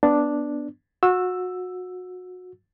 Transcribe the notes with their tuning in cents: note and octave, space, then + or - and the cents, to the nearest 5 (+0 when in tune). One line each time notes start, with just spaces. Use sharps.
B3 +0 D4 +0
F#4 -25 E6 +5